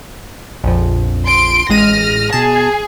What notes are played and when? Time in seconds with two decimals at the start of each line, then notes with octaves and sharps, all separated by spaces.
0.64 A#1 F2 F3
1.25 C6 D7
1.69 A1 G#3 F6 A#6 D#7
2.33 B2 G#4 A5